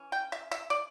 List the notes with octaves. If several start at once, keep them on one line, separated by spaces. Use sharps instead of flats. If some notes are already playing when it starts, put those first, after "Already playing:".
Already playing: E3 C#4
G5
E5
E5
D5